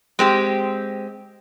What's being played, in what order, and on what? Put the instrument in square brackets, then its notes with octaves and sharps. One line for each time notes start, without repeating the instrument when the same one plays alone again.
[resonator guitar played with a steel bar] G#3 C4 G4